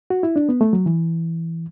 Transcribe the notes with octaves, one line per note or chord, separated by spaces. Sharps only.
F#4
E4
D4
B3
A3
F#3
E3